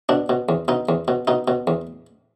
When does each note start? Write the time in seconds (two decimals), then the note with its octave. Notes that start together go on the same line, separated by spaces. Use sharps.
0.09 B2 D4
0.29 B2
0.49 E2
0.68 B2 D#4
0.89 E2
1.08 B2
1.27 B2 D#4
1.48 B2
1.67 E2